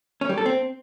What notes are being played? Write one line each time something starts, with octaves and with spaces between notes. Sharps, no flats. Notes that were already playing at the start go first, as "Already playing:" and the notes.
C#4
G3
A4
C4